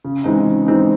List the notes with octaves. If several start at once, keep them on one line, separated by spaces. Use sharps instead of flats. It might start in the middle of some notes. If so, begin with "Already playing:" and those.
C#3
E3 G#3 C4 D#4
C#3
E3 G#3 C4 D#4